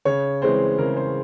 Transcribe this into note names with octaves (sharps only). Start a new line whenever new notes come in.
C#3 C#5
E3 G#3 C4 C5
C#3 A#4
C5